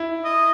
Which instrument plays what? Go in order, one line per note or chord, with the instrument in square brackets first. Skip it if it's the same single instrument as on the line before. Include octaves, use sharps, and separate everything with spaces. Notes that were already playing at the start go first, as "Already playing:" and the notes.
Already playing: [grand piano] E4
[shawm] D#5